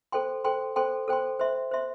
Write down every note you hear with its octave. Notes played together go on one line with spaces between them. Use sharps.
A4 C5 G5 C6
A4 C5 G5 C6
A4 C5 G5 C6
A4 C5 G5 C6
C5 E5 C6
C5 E5 C6